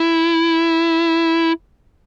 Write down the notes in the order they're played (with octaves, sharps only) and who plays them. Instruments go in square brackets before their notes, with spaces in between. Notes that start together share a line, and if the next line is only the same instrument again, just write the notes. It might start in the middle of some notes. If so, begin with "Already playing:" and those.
Already playing: [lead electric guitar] E4